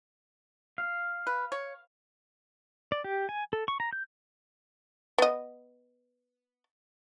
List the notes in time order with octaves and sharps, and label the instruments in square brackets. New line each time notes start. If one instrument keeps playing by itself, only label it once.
[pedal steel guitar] F5
[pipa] B4
C#5
[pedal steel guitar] D5
G4
G#5
A4
C#6
A#5
G6
[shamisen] B3 D#5